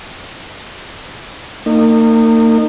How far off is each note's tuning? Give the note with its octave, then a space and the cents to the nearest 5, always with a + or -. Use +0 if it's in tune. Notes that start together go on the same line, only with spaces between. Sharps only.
A#3 -40 D#4 -25